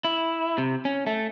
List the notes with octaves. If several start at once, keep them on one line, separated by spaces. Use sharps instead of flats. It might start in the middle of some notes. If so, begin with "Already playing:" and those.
E4
C3
C#4
A3